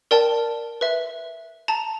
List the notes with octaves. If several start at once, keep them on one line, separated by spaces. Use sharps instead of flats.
A#4 D5 G5 A5
B4 E5
A5 A#5